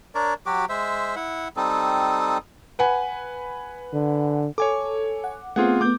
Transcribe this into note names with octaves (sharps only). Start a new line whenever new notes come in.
D4 A#4 C#5 D5
F#3 F#4 G4 D6
G#3 C5 E5
E4 F#5
G3 C4 D#4 A4
B4 F#5 G#5
D3
A4 C#5 G#5 D6
F#5
A3 B3 C4 F4 G#4 F#5
A3 B3 D6 G6